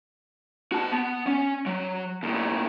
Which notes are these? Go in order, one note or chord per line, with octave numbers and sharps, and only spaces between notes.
F#4 A5
B3
C#4
F#3
D#2 A2